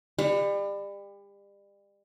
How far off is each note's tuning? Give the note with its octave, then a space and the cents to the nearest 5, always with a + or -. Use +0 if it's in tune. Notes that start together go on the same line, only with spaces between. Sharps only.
G3 +35